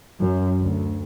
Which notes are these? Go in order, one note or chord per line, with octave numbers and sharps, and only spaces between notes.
F#2
D2